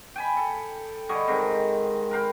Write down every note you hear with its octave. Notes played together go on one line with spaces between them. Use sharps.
G5 G#5 B5
A4
D3 G3 C#5 D#5
G#2 D#3 C4
A#4 B4 F5 G5